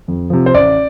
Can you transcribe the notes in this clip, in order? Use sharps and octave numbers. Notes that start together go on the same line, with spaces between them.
F2
C3 F3
C5
A1 D5